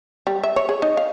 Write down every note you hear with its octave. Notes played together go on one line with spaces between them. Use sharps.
G3
E5
C#5
G#4
D#4
F5